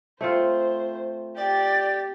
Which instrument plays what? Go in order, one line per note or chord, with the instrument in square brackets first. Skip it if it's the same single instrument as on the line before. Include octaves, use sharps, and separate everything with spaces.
[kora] A3 C4 F4 [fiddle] C5
[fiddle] G4 [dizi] D5